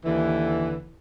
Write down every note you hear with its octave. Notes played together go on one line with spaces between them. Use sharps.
D#2 D3 E3